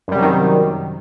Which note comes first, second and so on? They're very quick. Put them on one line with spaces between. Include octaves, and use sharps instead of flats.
F#2 G3 C3 F#3 D#3